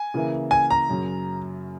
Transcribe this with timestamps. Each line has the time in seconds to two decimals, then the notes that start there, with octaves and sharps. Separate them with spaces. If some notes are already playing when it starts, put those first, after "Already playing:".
Already playing: G#5
0.14 C#3 E3 A#3 E4
0.51 G#5
0.70 A#5
0.90 F#2 C#3 F#3